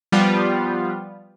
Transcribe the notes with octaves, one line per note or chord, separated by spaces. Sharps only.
F3 G3 B3 F4